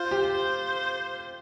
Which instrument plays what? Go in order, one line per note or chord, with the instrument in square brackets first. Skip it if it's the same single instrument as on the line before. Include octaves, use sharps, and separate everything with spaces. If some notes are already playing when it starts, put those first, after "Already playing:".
Already playing: [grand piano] F4 [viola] C5
[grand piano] G4
[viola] C5